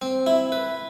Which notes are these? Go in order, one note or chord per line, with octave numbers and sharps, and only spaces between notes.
C4
E4
B4